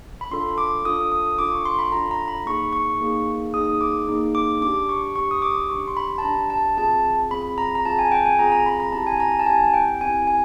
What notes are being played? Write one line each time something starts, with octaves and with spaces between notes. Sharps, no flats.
B5
D4 F4 A4 C6
D6
D4 F4 A4 D#6
D#6
D4 F4 A4 D6
C#6
C6
B5
D4 F4 A4 A#5
A#5
B5
A#3 D#4 G#4 C#6
C#6
A#3 D#4 G#4
A#3 D#4 G#4 D#6
D6
A#3 D#4 G#4
D6
D4 G4 D6
C#6
D4 G4 C#6
D#6
D6
D4 G4 C#6
C6
B5
A5
D4 G4 A#5
A5
C4 F4 G#4 A5
C4 F4 G#4 B5
A#5
A#5
C4 F4 G#4 A5
G#5
G5
G#5
C4 F4 G#4 A#5
A#5
B5
A#5
C4 E4 G4 A5
G#5
A#5
A5
C4 E4 G4 G#5
G5
C4 E4 G4 G#5
G#5